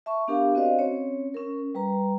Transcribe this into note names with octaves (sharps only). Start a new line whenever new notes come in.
E5 A5 C#6
B3 D4 G4 A#4 F5
C4 F#4 C5 D5 D#5 F5
C4 C#4 C#5
C#4 A#4
G3 B4 A#5